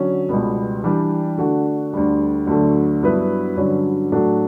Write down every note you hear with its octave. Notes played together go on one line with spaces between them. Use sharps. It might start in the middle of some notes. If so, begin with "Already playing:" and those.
Already playing: D3 F#3 C#4
C#2 B2 G3 B3
E3 G3 D4 G4
D3 A3 D4 F#4
D2 D3 G3
D2 D3 F#3 A3
G2 F#3 B3 E4 B4
G2 D3 F#3 C#4
A2 F#3 A3 D4 F#4